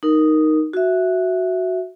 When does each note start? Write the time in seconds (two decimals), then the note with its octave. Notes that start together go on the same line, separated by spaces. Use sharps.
0.03 D#4 A#4
0.73 F#4 E5